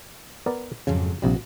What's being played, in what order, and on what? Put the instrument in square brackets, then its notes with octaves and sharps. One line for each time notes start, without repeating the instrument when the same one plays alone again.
[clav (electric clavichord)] B3 A#4 D5
[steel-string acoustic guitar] F2 G#2 F#3 [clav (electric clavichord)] C#3
[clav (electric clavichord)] A#1 C3 G3 [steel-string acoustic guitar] F#4